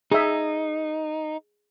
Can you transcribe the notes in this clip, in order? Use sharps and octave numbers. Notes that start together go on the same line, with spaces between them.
D#4 G#4 E5